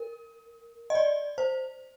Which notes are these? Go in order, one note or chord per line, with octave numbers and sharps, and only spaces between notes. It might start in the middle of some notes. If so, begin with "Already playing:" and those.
Already playing: A#4
D#5
D5
C5